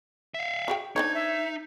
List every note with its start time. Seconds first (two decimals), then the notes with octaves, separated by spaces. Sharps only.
0.34 E5 F5
0.68 F#4 G#4 G5
0.96 D4 D#4 C5 C#5 G#6
1.15 E5